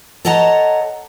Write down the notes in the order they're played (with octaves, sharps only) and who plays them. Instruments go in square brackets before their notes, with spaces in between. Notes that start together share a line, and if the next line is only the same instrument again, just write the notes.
[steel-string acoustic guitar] A4 C#5 D#5 F#5 A5 A#5